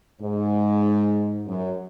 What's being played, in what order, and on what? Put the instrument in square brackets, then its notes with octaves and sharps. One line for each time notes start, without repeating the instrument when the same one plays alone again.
[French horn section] G#2
F#2